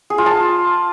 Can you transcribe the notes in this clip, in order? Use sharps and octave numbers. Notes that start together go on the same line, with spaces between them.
G#4
F4
A5